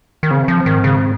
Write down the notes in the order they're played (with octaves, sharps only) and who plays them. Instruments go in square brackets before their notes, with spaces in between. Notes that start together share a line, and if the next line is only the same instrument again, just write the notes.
[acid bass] D#3
[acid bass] C#3 [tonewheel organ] C4
[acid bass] F3
[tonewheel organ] G#2 [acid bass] D#3
[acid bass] C#3